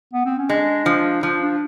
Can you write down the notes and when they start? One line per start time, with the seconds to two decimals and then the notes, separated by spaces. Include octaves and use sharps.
0.13 B3
0.25 C4
0.38 C#4
0.49 G#3 D4
0.86 F3 D4
1.23 F3 D4
1.42 D4